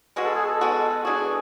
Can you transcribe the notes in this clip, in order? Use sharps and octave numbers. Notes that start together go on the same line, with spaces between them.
B2 G#3 B3 F#4
A4
G#4
A4
B2 G#3 B3 F#4
E3 B3 D4 F#4 G#4